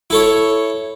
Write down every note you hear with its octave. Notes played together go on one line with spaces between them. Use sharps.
E4 A4 C#5